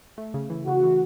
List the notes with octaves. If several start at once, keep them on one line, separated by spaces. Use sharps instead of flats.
A3
C#3
E3
C#3 F#4
E3